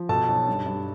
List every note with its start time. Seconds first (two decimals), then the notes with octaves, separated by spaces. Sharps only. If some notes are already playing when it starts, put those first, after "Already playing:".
Already playing: F3
0.09 B2 A4 A5
0.28 B1
0.48 G2
0.66 G2